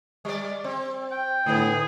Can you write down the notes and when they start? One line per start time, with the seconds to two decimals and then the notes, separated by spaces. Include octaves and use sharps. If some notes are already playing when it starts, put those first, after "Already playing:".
0.25 G3 D5
0.64 C4
1.11 G5
1.46 A2 D3 B3 G#4